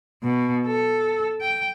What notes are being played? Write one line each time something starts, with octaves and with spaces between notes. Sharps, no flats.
B2
A4
G5